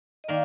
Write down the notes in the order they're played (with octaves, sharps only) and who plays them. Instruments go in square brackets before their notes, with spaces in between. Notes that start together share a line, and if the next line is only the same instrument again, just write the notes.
[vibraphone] D#5
[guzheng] D#3 A#3 A#4 [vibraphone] D5